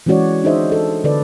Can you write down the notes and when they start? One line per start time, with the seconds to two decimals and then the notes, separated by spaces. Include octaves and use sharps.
0.06 E3 G#3 C#4 F#4 C#5 D5
0.44 D4 D#4 G#4 C5 D#5 E5
0.72 A4
1.04 D3 A4 B4 D5